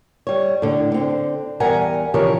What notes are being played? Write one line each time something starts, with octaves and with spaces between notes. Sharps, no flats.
G3 C#5
A2 D3
D3 C4
E2 G3 A#4 F#5 G#5 A#5
C#3 E3 F3 G4 A#4 C#5